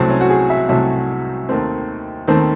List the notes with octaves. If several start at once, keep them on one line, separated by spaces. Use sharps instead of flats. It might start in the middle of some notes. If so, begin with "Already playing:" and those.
Already playing: C2 C3 F#3 A3 C4
C#4
F#4
G#4
E5
C2 C3 F#3 A3 E5
D#2 D#3 A3 C4
D#2 D#3 A3 C4